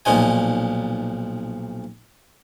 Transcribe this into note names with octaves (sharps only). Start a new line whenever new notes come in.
B1 A#2 F3 D#4 G#5